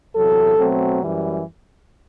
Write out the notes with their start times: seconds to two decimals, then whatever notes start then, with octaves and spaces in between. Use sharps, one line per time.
0.15 E2 C3 F#3 A4
0.57 B2 F#3 A3 C4
1.00 F#2 E3 G3